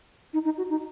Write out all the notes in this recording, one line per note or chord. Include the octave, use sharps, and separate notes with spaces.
D#4
D#4
F#4
D#4